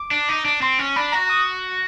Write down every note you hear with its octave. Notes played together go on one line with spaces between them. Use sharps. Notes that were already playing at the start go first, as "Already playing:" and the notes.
Already playing: D6
D4
D#4
D4
C4 C6
C#4
D4 B5
F#4 A#5
D#6